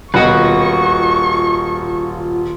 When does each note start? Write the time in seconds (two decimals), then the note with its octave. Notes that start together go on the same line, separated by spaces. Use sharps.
0.14 D#1 F4 F#4 B4 D#5 C#6